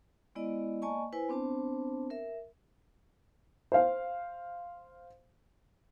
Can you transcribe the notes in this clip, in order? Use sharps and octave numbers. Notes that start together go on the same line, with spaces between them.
G#3 B3 E4 D5 D#5
A#3 D5 D#5 G#5 A5 C#6
E4 B4 C5 G#5
B3 C4 D4 C5 A5
A#4 E5
C5 F5